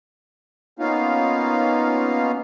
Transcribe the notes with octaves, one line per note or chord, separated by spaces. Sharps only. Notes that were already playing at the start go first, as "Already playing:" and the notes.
A#3 B3 C#4 D#4 F4 F5